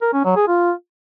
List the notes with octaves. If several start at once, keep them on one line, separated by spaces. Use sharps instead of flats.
A#4
C#4
F#3
G#4
F4